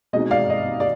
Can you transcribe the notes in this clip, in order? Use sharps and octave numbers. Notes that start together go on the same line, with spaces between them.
B2 G#3 C4 D#4 D#5
D5 F5
D#5
D5